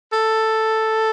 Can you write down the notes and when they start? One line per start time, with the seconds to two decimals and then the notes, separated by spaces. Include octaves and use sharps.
0.13 A4